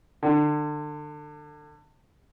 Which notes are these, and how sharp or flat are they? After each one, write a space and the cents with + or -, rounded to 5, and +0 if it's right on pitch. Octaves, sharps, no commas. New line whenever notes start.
D3 +30